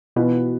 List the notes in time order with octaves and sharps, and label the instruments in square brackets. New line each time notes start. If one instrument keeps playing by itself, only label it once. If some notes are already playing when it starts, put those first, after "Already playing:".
[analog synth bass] B2 [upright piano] E3 B3 F4 B4